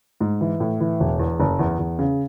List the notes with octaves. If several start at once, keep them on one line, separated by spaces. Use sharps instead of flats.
G#2
E3
A2
E3
E1
E2
F#1
E2
E2
C#3